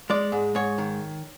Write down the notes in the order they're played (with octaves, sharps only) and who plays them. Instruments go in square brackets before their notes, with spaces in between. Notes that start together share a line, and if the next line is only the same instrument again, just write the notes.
[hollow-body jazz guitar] G#3 D5
G#2
G#2 C#5
D#3